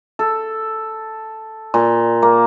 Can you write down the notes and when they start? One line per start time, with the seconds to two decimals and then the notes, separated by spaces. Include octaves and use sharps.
0.19 A4
1.74 A#2
2.22 A#3